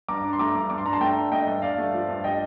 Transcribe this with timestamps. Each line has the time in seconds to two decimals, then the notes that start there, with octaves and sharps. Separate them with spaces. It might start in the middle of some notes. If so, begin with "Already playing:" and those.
0.08 G2 A#5 D6
0.24 D4
0.33 C6
0.39 A3 A#5 D6
0.55 G2
0.70 G2 D6
0.78 C6
0.86 D4 A#5
0.93 A5 C6
1.01 A3 G5 A#5
1.16 D4
1.32 A3 D#5 G5
1.47 G2
1.62 G2 D5 F5
1.78 A3
1.93 F3
2.09 G2
2.24 G3 D#5 G5